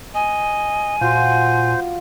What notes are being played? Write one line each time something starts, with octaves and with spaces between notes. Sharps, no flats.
D#5 G#5
A#2 F4 F#4 C5